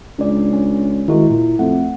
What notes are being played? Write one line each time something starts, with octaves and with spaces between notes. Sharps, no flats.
C#2 D4 D5
C#4
D#3 G#3 E4 F#4
A#2
F2 A3 F#5